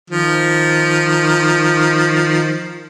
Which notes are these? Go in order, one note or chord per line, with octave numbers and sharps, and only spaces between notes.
D#3 F3